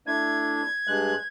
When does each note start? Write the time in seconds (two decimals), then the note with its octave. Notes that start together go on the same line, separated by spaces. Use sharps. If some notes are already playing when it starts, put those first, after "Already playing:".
0.07 A3 D4 E4 G#6
0.87 G2 G#3 F#6